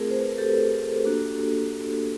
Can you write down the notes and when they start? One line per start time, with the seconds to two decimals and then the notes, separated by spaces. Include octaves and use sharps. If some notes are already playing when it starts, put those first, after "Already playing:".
Already playing: A3 C4 F4 G#4 A#4
0.11 C5
0.19 B4
0.29 A#4
0.38 G4 A4
1.05 A#3 D4 F#4